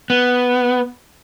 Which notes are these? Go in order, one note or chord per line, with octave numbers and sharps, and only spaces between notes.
B3